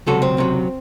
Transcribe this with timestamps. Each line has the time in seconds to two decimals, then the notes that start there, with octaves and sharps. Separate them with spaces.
0.07 C#2 C3 F#3 F#4 A4
0.22 C4
0.37 C#2 C3 F#3